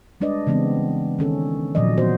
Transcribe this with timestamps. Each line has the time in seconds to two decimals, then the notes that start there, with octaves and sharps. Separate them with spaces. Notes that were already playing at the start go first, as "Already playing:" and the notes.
0.20 G3 G#3 D4 B4 D5 D#5
0.47 C#3 E3 G#3 B3 C4
1.19 D#3 C#4 A4
1.75 A#2 D#3 F3 F#3 D5 D#5
1.97 E3 B3 F#4 C5